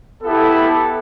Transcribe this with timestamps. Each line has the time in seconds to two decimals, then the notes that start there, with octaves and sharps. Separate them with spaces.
0.23 B3 E4 G4 A4
0.58 A4